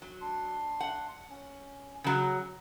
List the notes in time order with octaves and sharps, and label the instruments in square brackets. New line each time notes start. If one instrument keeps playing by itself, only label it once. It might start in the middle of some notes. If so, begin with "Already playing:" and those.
[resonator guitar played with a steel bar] F#3
[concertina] D4 C6
[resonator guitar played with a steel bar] F#5
[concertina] C#4
[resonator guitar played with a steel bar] C#3 F#3 [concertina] F#5